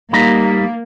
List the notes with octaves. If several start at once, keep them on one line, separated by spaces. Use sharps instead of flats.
G3 A#3 D#4 A#5